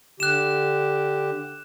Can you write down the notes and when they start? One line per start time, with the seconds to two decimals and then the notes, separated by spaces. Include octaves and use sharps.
0.20 D3 G4 F#6 E7